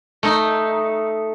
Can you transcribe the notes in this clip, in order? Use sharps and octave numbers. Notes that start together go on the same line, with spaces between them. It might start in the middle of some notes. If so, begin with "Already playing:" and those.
A3 D#4